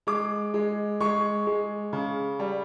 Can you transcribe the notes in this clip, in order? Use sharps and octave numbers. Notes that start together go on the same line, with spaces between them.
G#3 D6
G#3
G#3 C#6
G#3
C#3
G3